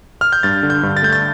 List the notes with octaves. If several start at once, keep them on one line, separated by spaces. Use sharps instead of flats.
F6
G6
G2 A6
D3
G6
G2
A6
A3 G6
A6